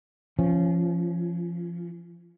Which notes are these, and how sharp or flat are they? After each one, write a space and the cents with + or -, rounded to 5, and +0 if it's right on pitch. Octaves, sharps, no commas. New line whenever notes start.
F3 -25 C#4 +0